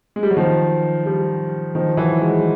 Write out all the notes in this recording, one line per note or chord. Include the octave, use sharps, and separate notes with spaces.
G#3
G3
F#3
D#3 F3
F3 G3
D#3 F3
E3 F#3
F#3 G#3